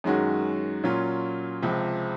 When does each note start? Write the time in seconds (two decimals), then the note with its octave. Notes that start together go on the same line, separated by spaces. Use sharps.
0.04 F#2 D#3 G#3 C#4 F#4
0.84 A#2 F#3 C#4 F4
1.62 C#2 C3 F3